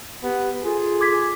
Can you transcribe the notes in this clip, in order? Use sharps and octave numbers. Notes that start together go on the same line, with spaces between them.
B3 G4
F4 G#4 A4
D6 G#6 B6